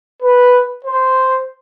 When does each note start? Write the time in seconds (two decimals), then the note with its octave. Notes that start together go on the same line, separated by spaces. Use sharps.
0.22 B4
0.84 C5